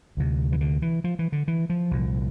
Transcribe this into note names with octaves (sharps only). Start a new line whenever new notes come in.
D2 C3
E3
D3
E3
F3
E3
D3
E3
F3
C2 A#2